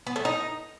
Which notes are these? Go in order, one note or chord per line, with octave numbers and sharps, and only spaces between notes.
B3
A3
D#4